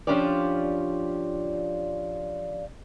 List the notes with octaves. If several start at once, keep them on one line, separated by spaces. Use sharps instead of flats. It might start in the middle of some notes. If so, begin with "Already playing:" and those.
F3 C#4 D4 F4 G4 D5